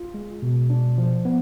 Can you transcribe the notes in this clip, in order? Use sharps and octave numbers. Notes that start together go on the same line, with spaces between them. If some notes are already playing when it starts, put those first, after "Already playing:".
Already playing: F4
G#3
B2
D4
F3
B3